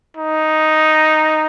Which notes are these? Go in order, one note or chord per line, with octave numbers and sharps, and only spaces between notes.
D#4